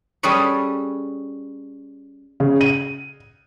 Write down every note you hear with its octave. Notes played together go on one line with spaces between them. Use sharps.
G3 C#4 G#4 A4 B4 C#5
C#3
D#7